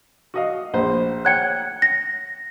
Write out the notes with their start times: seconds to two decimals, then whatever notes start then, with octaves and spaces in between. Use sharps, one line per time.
0.34 F#4 D#5 F5
0.74 A#1 C5
1.25 C#5 F#5 G5 F#6 G#6 C#7
1.82 A#6